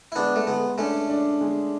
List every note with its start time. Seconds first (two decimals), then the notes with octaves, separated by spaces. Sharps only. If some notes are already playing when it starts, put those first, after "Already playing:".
0.12 E4
0.16 G#3 B3 D4
0.36 A3
0.47 G#3 B3
0.78 A3 C#4 D4
1.10 D4
1.41 G#3